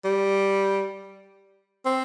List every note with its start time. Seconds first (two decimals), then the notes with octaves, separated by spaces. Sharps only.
0.04 G3
1.86 C4